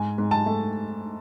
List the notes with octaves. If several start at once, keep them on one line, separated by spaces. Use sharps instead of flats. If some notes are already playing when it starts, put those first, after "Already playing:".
Already playing: G#2 G#5
G#2
A5
A3